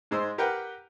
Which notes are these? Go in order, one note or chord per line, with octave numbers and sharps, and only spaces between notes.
G#2 G#3 C5 E6
G4 A#4 B4 F#5 G5